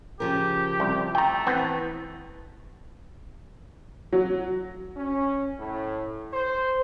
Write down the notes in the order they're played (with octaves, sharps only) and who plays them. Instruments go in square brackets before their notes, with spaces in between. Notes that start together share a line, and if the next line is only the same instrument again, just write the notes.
[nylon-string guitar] C#3 F3 A#4 [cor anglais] G4
[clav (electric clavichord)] C2
[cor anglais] A3 [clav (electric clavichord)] G5 A#5
[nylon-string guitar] E3 [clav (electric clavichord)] B3 C4
[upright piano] F#3
[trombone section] C#4
A2
C5